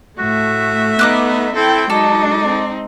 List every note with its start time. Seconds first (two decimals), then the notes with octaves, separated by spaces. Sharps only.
0.19 A2 A3 F#4 E5
0.99 B3 D#4 D#5 D6 F#6
1.56 C4 E4 A4 G5
1.90 F#3 G#3 D#4 A4 D5
2.45 C4